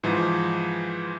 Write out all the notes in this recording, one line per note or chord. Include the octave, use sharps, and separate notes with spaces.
G#2 E3 F3